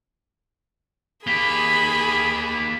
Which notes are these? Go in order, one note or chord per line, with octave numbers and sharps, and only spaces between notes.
A#3 G4 G#4 B5 B6 G7